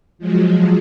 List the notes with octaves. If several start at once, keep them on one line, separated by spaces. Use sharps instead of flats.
F3 F#3 G#3